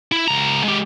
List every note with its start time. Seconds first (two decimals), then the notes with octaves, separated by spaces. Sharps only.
0.12 E4
0.28 C#2 A#5
0.64 G#3 G4